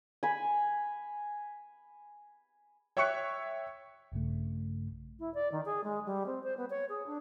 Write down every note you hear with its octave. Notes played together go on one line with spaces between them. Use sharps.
G#5 B5
C#5 E5 G5 C#6 F#6 C#7
A#1 G2 C#3 A3
E4
D5
D#3
G#4
G#3
G3
C4
C5
B3
C#5
G#4
D4